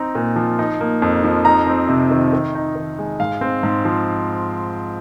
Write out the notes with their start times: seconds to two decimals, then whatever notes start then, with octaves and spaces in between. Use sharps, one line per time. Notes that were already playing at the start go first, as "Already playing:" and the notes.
Already playing: C4 D#4 A#5
0.15 A#2
0.36 F3
0.59 D#4
0.81 A#3
1.02 F2
1.24 F3
1.45 D#4 A#5
1.67 C4
1.89 C3
2.11 D#3
2.33 D#3
2.55 D#4
2.75 D#3
2.98 G#3
3.20 G#2 F5
3.41 C4
3.63 G#2
3.85 F3